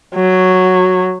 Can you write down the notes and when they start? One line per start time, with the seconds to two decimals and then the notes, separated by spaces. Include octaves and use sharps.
0.15 F#3